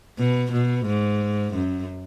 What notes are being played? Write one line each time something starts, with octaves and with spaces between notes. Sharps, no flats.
B2
B2
G#2
F#2